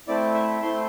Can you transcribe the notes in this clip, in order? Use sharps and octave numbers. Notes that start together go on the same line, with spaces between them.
A3 C4 E4 D5
E5
A3 C4 E4 C6